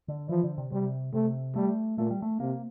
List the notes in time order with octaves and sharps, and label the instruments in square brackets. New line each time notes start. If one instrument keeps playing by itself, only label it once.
[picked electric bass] D3
[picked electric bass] E3 [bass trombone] F3
[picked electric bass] D3
C3
[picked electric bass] C3 [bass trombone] G3
[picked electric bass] C3 [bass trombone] A3
[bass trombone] G3 [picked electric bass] A3
[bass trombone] A#2 [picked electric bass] A3
[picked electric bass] G3
A3
[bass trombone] C3 [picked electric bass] A#3